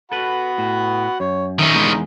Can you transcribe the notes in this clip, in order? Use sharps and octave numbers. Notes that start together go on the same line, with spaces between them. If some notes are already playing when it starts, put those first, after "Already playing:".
F#4 A4 B4 F#5 B5
A2
F#2 C#5
D#3 C#4 E5
E2 G#3 D#4 C6